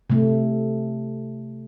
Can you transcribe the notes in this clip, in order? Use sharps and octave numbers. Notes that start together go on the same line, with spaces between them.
C3 A3